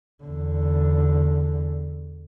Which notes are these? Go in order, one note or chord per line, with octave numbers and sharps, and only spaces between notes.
E2 D3